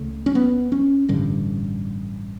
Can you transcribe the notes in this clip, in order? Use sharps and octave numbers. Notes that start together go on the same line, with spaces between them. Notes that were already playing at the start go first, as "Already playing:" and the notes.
Already playing: C#2 C#3 A3
C#4
B3
C#4
A1 G2 D3